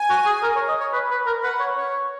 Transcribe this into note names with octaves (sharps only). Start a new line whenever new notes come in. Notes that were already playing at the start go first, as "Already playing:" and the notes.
Already playing: G#5
F#4
G#4
A#4
C#5
D#5
C#5
B4
B4
A#4
B4 F#5
C#5
C#5